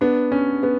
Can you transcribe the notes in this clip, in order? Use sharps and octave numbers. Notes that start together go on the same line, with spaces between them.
B3 D4
C#4
B3